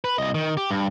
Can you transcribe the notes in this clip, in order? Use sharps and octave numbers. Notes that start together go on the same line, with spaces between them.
B4
C2 D#5
D#3
G4
G2